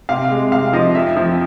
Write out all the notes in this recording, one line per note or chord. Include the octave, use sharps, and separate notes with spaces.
C3 F5
G#3
C3 F5
F3 D#5
F2 E5
F3